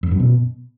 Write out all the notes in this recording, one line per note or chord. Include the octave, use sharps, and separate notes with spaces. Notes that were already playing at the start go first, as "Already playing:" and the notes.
F2
F#2
B2